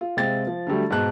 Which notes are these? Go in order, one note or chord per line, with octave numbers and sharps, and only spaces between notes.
F4
C3 G#3 C4 F5 G5 A6
F3
D3 F#3 G3 A3
G#2 B2 A5 F#6